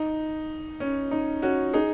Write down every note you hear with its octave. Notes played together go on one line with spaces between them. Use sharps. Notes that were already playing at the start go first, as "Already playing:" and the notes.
Already playing: D#4
C#4
D#4
C#4 F#4
D#4 G#4